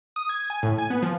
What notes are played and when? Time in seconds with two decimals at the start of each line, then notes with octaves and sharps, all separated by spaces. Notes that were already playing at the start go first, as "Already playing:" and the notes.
0.16 D#6
0.29 G#6
0.50 G#5
0.63 A2
0.78 G#5
0.90 B3
1.02 F3